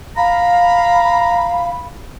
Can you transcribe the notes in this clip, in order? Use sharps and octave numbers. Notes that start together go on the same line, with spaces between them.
F5 A#5 B5